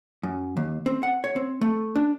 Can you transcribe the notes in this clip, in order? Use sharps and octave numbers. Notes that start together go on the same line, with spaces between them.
F#2
D#2
C4
F#5
C#5
C4
A3
D4